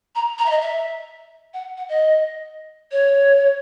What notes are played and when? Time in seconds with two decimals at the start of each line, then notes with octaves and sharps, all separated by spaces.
0.15 A#5
0.38 A#5
0.46 E5
0.50 D#5
0.62 E5
1.54 F#5
1.77 F#5
1.89 D#5
2.92 C#5